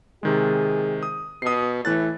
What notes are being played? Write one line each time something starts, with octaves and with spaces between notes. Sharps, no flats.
C3 D#3 G#3 G#4
D#6
B2 D#6 C7
A2 E3 F#6 A6